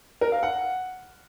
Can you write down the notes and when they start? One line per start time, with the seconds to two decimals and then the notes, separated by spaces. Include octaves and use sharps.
0.21 A#4
0.32 F5
0.43 F#5